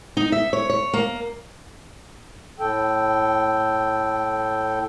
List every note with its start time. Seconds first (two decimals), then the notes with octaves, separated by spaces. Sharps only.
0.17 D#4
0.32 E5
0.53 C#5
0.70 C#5
0.93 A#3
2.59 A2 A4 G5